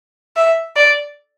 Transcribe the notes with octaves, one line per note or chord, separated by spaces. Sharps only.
E5
D5